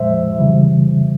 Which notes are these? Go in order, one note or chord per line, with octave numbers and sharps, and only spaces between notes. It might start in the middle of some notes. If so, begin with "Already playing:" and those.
Already playing: A#2 F3 G#3 C5 E5
C#3 E3 G3